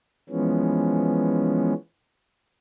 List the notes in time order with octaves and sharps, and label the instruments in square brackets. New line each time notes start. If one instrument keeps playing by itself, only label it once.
[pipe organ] E3 F3 G#3 B3 C#4